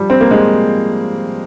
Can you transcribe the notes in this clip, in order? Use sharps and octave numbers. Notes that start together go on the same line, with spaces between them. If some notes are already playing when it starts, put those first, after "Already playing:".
Already playing: F3 G3
C4
A#3
G#3